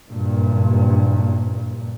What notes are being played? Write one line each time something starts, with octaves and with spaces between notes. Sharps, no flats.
F#1 G2 A#2